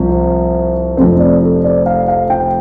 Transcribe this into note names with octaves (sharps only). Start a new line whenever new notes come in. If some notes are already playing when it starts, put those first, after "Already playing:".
Already playing: C2 C3 F3
C5
F1 F2 C3 A3 C4 C5
D5
A4
D5
F5
F5
G5